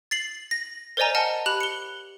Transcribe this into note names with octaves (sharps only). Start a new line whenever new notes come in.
A6 C7 F#7
A#6
A#4 C5 D5 D#5 G#5 A#5
D#5 F#5 A5 F6 C#7
G4 B5 F#6 F7 F#7
C#7 G7